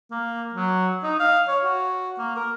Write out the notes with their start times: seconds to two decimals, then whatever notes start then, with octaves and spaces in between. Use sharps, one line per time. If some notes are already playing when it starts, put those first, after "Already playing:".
0.11 A#3
0.54 F#3
1.03 D#4
1.20 F5
1.48 C#5
1.64 F#4
2.18 A#3
2.36 A#4